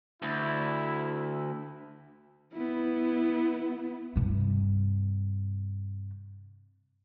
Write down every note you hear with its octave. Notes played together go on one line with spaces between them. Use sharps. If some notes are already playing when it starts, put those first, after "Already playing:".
D2 E4
B3 E4
G2 C3